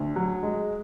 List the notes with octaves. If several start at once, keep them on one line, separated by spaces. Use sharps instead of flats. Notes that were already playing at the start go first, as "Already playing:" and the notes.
Already playing: D2
F#3
G#3